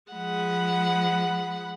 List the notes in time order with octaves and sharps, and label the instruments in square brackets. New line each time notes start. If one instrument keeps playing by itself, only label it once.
[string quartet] F3 G#3 F#5 B5